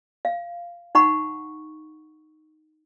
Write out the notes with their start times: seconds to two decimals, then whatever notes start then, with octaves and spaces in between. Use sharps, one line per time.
0.25 F5
0.95 D#4 F#5 B5 C#6